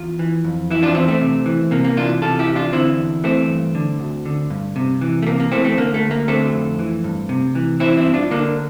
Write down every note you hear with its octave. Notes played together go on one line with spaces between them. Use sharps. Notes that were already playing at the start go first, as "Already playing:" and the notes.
Already playing: E2 F4
E3
F2
E3 E4
D4 F4
E2 C4 E4
A3 C4
C3
E3
C3 A#3
A#3
E3 D4 F4
C3 F4 A4
E4 G4
E3
D4 F4
D3 C4 E4
E2
E3 A3 C4
G2
D3
D2
D3
G2
C3
E3
A3
C3 A#3
A#3
E3 A3 C4
A3 C4
D3 A#3
A3
D2
A#3
D3 A3 C4
F2
E3
G2
C3
E3
E3 C4 E4
C4 E4
G2
D4 F4
D3 A#3 D4